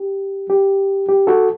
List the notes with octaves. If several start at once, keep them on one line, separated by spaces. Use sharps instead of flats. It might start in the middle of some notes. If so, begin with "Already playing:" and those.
Already playing: G4
G4
G4
F#4 A4